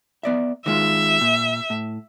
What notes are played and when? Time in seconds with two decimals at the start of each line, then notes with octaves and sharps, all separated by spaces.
0.23 B3 D5 E5
0.66 D#3 G#3 F4 E5
1.21 A#2
1.70 A2